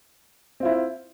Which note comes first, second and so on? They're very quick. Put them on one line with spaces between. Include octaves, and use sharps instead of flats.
C4 F4 E4